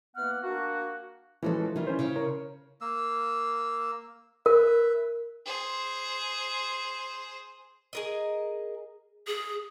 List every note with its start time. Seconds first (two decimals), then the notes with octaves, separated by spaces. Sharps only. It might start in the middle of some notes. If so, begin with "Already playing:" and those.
0.16 E3 A#3 B3 F#5 F6
0.43 A#3 D4 F#4
1.43 E3 F3 G#3 C#4 F#4 A4
1.76 D#3 E3 G3 F4
1.87 C#4 C5
1.99 C#3
2.16 A#4 C#5
2.81 A#3 E6
4.46 A#4 B4 E5
5.46 G#4 C5
7.93 G#4 A#4 D#5
9.27 G#4